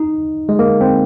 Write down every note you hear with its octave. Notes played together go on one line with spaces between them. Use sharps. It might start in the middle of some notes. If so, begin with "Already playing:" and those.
Already playing: D#4
G#3
A#3
C4